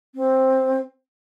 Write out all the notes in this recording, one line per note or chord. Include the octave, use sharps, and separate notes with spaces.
C4